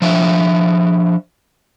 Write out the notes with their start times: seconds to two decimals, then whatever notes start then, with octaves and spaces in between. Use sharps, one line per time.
0.02 F3 D4 E5